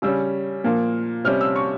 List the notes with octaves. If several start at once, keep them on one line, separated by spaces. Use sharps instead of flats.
C#3 G3 C#4 E6
A#2 F3 A#3
C3 G3 C#4 F6
E6
C#6